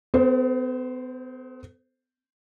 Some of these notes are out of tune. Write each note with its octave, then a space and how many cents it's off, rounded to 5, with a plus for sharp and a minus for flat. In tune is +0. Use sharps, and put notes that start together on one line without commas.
B3 +45 A4 +0 C5 +0